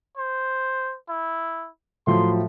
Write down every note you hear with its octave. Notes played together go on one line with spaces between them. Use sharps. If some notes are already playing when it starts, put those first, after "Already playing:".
C5
E4
A2 F3 F#3 C6